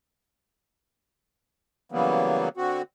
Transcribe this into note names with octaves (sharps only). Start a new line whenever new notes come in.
C#3 E3 F#3 G3 A#3 B3
D3 C4 F#4